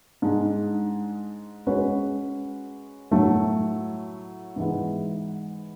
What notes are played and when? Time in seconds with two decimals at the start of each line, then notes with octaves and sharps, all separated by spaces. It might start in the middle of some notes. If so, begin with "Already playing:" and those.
0.22 G#2 G#3 D4
1.67 G#3 C#4 F#4 B4
3.11 A2 F#3 A3
4.56 G#2 E3 G#3 B3